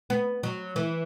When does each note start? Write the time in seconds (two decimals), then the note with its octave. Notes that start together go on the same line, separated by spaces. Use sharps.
0.10 B3
0.43 F#3
0.76 E3